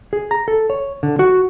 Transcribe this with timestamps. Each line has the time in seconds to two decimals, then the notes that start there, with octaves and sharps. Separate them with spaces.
0.13 G#4
0.31 A#5
0.48 A4
0.70 C#5
1.03 D3
1.19 F#4